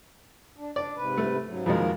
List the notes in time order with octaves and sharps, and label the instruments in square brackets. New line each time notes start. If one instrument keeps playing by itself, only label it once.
[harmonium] D4
[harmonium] D4 [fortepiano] D5
[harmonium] G#2 C3 B4
[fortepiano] A3
[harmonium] G#2 C#3 F#3
[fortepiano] F2 B2 G#3 [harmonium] D#3 A#3 A#4